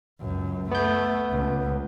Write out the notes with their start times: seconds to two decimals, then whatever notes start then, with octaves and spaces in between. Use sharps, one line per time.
0.21 C#2 F#2
0.71 A3 B3 G6
1.31 C#2